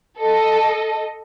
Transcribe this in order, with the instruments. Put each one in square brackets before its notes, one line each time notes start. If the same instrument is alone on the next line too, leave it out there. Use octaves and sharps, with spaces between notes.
[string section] A4 D#5